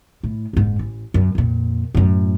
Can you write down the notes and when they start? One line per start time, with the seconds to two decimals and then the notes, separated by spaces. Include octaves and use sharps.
0.23 A2
0.53 F#1 G#2
0.79 A1
1.14 F#2
1.35 F2 A#2
1.94 F#2 A2